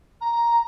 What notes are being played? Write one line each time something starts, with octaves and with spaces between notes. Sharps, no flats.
A#5